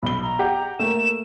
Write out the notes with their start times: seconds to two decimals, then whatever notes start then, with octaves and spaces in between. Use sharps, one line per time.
0.03 B1 B5 G7
0.23 A#5
0.39 G4 F#5
0.79 A3 A#3 E7